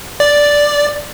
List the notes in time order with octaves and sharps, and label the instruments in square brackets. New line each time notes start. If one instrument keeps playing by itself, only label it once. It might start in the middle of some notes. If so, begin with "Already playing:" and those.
[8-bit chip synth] D5